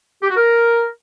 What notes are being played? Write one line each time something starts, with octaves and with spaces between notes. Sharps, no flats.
G4
F#4
A#4